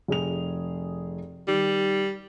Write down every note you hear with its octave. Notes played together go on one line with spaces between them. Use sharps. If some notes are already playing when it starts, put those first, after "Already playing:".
F1 G#4 F7
D#3 G3